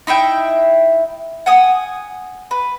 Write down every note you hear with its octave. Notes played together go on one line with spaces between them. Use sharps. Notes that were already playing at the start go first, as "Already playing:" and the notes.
D#4 E4 E5 G5
F#5 G#5 D#6
B4